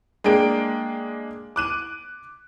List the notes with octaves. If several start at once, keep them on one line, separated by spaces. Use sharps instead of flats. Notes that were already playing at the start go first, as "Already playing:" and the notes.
G#3 A#3 D4 G5 D7
D6 F#6 D#7